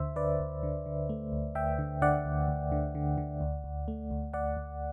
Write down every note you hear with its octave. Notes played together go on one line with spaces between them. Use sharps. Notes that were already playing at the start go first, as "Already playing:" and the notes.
Already playing: D2 D3 C5 E5
D3 B4 D5
D2
D3
D3
A3
D2
D2 E5 G5
D3
D3 D5 F#5
D2
D2
D3
D3
D3
D2
D2
A3
D2
D2 D5 F#5
D2